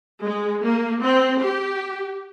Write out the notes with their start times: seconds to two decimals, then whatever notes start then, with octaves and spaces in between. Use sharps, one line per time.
0.25 G#3
0.64 A#3
1.03 C4
1.42 G4